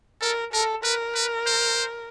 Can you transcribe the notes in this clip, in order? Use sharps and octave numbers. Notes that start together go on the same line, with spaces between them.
A4 A#4
A4 A#4
A#4 B4
B4
C5